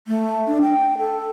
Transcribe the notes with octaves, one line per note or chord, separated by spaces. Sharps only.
A3
D4
G5
A4